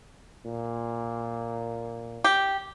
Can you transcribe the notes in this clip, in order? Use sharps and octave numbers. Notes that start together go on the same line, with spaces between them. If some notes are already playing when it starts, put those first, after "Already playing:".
A#2
G4